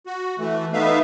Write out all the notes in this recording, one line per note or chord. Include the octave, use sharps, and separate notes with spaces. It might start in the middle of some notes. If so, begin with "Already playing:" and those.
F#4
E3 A3
A3 B3 D#4 B4 E5 F5